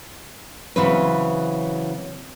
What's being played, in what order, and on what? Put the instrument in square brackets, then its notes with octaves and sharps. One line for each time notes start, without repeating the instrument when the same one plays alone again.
[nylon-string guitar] C#3 E3 F#3 C4 B4